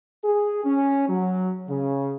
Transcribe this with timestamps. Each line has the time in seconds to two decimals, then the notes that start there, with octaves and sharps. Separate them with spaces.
0.24 G#4
0.65 C#4
1.09 F#3
1.69 C#3